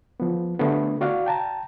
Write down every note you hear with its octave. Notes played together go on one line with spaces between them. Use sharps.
F3 B3
D3 A3 B3
F#4 D5 F5 F#5
G5 A5 A#5